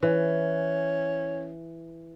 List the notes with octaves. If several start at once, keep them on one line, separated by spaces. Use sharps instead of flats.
E3 C#4